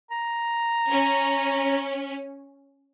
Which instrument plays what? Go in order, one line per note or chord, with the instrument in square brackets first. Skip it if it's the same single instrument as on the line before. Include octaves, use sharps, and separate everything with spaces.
[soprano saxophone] A#5
[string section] C#4